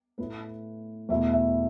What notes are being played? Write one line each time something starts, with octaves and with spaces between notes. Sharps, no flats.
A2 A3 E4 B4
E2 B2 A3 E4 E5
E5